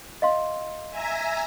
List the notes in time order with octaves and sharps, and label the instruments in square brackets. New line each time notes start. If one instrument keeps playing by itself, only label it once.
[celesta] D#5 F5 C6
[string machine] E5 G#5 A#5